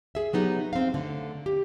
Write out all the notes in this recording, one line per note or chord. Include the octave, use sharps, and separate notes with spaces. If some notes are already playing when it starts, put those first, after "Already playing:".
G#4 E5
F#3 B3 D#4 G4
C4 F5
D3 A3
G4